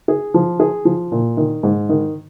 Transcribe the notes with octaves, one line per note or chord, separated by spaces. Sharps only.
G#4
F3
G#4
F3
A#2
D#3
G#2
D#3